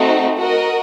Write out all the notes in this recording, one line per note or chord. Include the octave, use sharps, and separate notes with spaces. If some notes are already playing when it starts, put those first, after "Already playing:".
Already playing: A3 C4 D#4 F#4
F#4 A#4 D#5